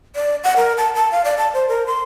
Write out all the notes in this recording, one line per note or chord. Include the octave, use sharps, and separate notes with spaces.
D5
F#5
A#4
A5
A5
F5
D5
A5
C5
A#4
C6